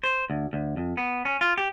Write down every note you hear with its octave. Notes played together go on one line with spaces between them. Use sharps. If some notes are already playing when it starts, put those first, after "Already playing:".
C5
D2
D2
F2
B3
C#4
F4
G4